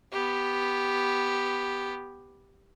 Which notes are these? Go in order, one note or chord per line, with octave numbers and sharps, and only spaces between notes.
B3 G4